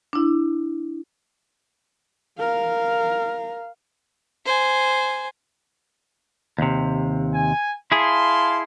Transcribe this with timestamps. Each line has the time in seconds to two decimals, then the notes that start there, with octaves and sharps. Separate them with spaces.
0.13 D4 E4
2.39 A#4 F5
4.44 C5 G#5
6.58 D#2 C3
7.34 G#5
7.92 E4 G#4 F5 A5 C6